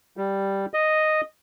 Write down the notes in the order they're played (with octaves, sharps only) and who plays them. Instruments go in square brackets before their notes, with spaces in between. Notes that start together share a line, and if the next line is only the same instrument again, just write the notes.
[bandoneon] G3
D#5